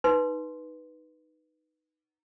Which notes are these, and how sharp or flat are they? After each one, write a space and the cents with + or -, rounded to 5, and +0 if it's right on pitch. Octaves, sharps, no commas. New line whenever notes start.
D#4 +0 B4 -5 C6 +0